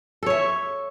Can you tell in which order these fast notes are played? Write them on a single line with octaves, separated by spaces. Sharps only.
A4 C#5 E5